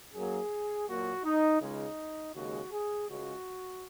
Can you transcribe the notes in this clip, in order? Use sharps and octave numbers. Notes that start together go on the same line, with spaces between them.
F#2 F#3 A#3 G#4
A#2 F#3 A#3 F#4
D#4
C#2 C#3 G#3 D#4
D#2 C#3 G#3 F#4
G#4
C#2 C#3 G#3 F#4